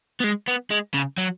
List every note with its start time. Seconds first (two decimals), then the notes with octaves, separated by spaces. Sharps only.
0.20 B3
0.24 G#3
0.48 B3
0.71 G#3
0.94 C#3
1.17 F#3